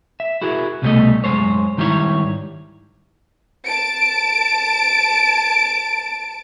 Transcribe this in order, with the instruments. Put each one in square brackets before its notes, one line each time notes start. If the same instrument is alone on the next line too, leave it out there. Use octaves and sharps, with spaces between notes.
[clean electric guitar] E5
E4 F#4 G#4 A#4
C2 B2 E3 G3 A3 D#5
F#2 C#3 G#3 C5 C#5
G#2 D#3 G3 E4 C#5
[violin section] A5 D7